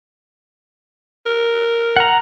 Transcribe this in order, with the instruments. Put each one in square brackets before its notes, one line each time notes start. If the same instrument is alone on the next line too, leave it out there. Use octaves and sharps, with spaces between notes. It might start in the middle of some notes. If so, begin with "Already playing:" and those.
[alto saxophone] A#4
[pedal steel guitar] F#5 A#5